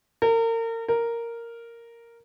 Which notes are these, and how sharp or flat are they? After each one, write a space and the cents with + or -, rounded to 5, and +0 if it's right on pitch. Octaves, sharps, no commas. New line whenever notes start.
A#4 -35
A#4 -5